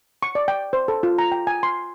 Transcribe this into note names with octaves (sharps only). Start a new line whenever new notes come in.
C#6
D5
G5
C5
A4
F4
A#5
G5
G#5
C6